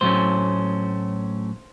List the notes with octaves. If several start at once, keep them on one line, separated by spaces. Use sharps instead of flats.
A2 F#3 A3 C#4 C5